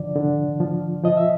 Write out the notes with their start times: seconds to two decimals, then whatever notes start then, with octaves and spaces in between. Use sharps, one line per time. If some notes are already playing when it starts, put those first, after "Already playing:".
Already playing: D3 F3 D5
0.16 D3
0.60 F3
1.04 F3 D#5
1.17 E5